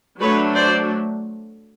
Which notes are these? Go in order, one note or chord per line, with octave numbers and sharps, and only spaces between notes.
F#3 A3 D4 B4 C#5
C5 D5